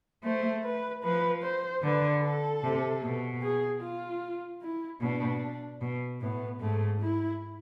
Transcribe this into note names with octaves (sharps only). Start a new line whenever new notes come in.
A3 C5
B4
F3 B4
C5
D3 B4
A4
C3
B2
G#4
F4
E4
B2 D4
B2
A2 B3
G#2 A3
E4